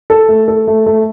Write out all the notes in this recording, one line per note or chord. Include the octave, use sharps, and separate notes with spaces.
A4
A3
A4
A3
A3